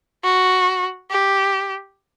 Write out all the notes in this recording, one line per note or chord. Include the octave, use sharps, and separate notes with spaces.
F#4
G4